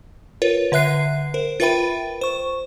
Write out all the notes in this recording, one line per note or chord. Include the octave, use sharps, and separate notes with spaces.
F4 A#4 B4 C#5
D3 B4 E5 F#6 C7
A#4 C5
F4 A#4 B4 E5 G5 B5
C5 C#6